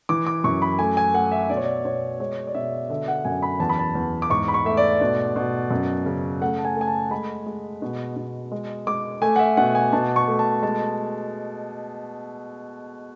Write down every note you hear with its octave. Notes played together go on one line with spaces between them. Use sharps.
E3 D6
D6
F#2 C#6
B5
A3 G#5
G#5
A3 F#5
E5
B2 D5
C#5
D5
B2 C#5
G#3 C#5
D5
B2 E5
D3 E5
F#5
F#2 G#5
B5
E2 A5
B5
A5
E2
D6
G#2 C#6
B5
C#6
A3 E5
D5
B2
B2
F#2
C#3
A3 F#5
A5
G#5
A3 G#5
A5
G#3 B5
G#3
B2
B2
G#3
G#3 D6
A3 G#5
F#5
E5
B2 F#5
G#5
B2 A5
C#6
A3
A5
G#3 A5